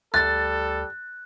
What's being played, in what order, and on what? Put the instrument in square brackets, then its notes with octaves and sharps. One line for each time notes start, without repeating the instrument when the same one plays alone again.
[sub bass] D2 [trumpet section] G3 A4 [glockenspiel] F#6 [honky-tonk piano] A6